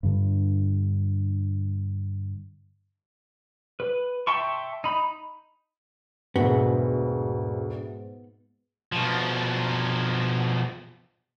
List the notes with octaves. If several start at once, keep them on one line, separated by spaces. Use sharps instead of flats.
G2 D3
B4
E5 G5 A5 C6 C#6
D#4 B5
E1 D2 G#2 B3 F#4 G#4 E5
B2 F3